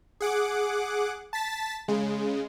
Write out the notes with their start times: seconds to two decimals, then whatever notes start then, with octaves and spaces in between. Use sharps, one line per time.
0.21 G#4 F#5 D6
1.33 A5 A6 B6
1.88 C#3 G#3